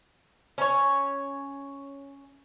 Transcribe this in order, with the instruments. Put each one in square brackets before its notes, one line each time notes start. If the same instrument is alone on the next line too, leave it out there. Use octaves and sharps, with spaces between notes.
[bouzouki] C#4 C#5